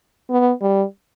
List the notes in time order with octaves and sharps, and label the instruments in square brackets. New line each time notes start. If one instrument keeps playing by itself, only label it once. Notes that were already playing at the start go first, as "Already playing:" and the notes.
[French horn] B3
G3